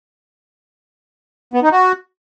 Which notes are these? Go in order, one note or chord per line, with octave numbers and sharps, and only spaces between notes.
B3
D#4
F#4